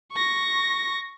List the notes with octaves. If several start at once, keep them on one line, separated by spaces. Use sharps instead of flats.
C#6 A#6